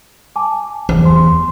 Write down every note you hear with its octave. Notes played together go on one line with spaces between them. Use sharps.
G#5 A5 D6
E2 C5
C6